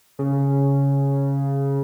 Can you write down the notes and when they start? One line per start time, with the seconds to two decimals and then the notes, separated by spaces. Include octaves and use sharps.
0.19 C#3